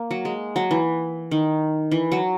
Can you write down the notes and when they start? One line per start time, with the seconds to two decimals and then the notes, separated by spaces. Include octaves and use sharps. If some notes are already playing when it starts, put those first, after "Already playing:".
Already playing: A#3
0.11 F#3
0.25 G#3
0.56 F#3
0.71 E3
1.31 D#3
1.92 E3
2.12 F#3